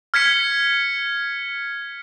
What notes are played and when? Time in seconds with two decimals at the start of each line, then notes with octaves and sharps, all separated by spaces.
0.14 F6 G#6 B6 C#7